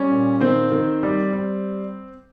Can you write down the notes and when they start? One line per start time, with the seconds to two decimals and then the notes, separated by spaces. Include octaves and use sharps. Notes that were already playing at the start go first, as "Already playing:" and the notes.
Already playing: G3 C#4 C#5
0.10 A#2
0.41 D#3 C4 C5
0.72 D#3
1.03 G3
1.33 G3